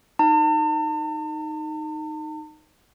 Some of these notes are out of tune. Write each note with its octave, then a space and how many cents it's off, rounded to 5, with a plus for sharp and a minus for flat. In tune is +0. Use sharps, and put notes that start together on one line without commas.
D#4 -5 A5 +45